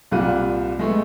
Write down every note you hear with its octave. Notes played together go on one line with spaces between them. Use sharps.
C2 A#2 G3 F4 F#6 D#7
G#3 A3 B3